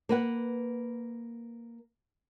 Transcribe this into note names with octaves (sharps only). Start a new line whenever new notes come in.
A#3 B4 F#5